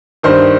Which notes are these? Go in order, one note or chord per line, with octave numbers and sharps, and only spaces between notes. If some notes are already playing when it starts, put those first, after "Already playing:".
G2 D#3 C5